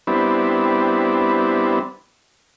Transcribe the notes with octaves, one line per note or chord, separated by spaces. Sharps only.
G3 B3 C4 D4 E4